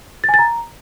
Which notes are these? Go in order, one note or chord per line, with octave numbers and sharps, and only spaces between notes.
A6
G#5
A6
A#5